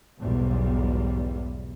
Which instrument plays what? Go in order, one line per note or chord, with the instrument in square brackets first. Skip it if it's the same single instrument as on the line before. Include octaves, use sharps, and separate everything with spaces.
[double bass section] B1 E2 G#2 G3